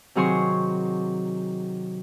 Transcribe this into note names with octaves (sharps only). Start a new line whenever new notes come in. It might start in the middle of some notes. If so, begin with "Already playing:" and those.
C3 D#3 F#3 G#4 C6 C#6